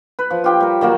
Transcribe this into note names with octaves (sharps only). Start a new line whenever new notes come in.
B4
F3
F4 G4 G5
G3 A#4
D#3 F#3 A#3